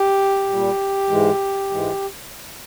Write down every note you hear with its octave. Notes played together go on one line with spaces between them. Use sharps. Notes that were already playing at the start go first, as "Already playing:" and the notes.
Already playing: G4
A#2 G3
G#2 E3 G#3
G#2 E3 G#3